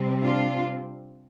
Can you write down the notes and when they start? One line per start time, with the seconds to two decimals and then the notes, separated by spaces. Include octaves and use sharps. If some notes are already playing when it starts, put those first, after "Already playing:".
Already playing: C3 G3 C4
0.22 D4 F4